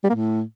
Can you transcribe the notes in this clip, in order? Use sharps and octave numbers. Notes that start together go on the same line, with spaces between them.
G3
A#3
A2